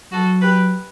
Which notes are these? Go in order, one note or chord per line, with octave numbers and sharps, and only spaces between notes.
F#3 F#4 A4
G4 B4